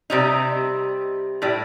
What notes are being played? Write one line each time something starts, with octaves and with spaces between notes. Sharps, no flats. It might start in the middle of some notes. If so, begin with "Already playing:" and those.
C3 G3 D#4
A2 G3